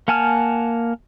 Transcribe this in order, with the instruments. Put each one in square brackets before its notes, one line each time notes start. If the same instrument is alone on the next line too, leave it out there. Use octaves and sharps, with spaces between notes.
[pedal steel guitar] A#3 F#5 G#5 A5 F6